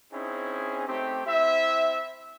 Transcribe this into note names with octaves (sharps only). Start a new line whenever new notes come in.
C4 C#4 D#4 E4 G#4
A3 C4 D#4 G4
C4 E4 E5